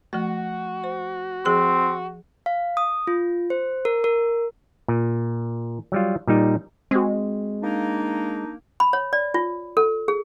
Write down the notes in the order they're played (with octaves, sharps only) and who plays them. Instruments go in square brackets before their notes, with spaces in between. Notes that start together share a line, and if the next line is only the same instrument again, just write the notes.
[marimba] F3 A3 [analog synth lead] F#4
[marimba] C5
[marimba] F3 G#4 E6 [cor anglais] C4
[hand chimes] F5
D#6
F4
C5
A#4
A#4
[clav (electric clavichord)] A#2
F#3 G3 F4
A#2 G3 D#4
[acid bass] G#3 [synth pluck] C4 F#4
[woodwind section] A#3 D4 D#4
[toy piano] B5
C#5
D5
F4
A4
G#4